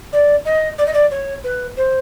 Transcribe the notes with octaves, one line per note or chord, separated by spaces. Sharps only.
D5
D#5
D5
D#5
D5
C#5
B4
C5